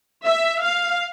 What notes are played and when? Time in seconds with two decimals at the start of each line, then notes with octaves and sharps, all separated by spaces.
0.24 E5
0.62 F5